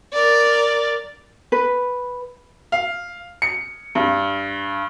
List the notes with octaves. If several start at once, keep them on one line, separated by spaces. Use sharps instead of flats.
A#4 D5
B4
F5
C#7
G2